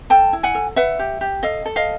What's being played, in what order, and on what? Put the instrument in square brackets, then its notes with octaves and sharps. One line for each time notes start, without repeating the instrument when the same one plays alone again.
[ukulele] A4 G5 A5
E4
F#5 G#5
A4
B4 E5 F#5
G4
G4
A4 D#5 F5
A4
D#5 F5